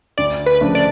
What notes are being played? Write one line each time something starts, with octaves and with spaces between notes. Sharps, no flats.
D2 D5
B4
C#3 F3 A3 D4
D5